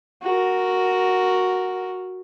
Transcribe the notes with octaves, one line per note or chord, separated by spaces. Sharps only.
F#4 A#4